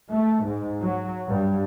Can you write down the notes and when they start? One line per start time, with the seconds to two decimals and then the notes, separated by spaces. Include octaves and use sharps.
0.11 A3
0.45 G#2
0.82 F#3
1.28 G2